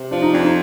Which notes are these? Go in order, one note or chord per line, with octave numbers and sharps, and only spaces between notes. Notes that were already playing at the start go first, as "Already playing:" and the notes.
Already playing: C3
F3 D4
D#4
F2 D4
D#4